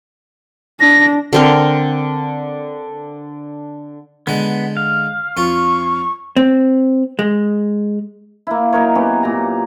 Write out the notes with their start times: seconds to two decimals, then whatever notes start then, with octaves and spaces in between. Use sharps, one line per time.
0.80 D4 A#6
1.33 D3 C4 A#4
4.27 D3 G#3 B3
4.77 F5
5.37 F2 F4 C#6
6.36 C4
7.19 G#3
8.47 A#3 E4
8.73 F#3 D#4 A#4 C#5
8.95 F#3 B3 C#4 G4
9.23 A#2 A#5